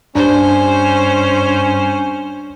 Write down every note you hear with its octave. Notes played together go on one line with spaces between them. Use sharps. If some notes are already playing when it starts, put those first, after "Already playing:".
G2 C#4 D4 C5